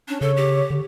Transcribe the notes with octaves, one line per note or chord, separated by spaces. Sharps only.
C#4 D4
C#3 A4 C#5
G4
D3